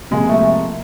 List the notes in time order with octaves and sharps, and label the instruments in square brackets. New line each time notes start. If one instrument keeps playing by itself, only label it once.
[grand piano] C3 F3 A#3 [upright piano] G#3
[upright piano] A3